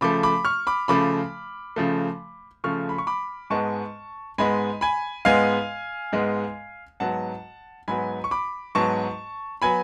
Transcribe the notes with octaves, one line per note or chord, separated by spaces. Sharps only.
C#3 F3 A3 B5 D6
B5 D6
C#6 F6
B5 D6
C#3 F3 A3 B5 D6
C#3 F3 A3
C#3 F3 A3 C#6 F6
B5
C#6
B5 D6
G#2 G#3 B3 A5 C#6
G#2 G#3 B3 G#5 B5
G#5 B5
G#2 G#3 B3 F5 G#5
G#2 G#3 B3
G#2 F#3 B3 F#5 A5
G#2 F#3 B3 G#5 B5
C#6
B5 D6
G#2 F#3 B3 A5 C#6
F#3 B3 G#5 B5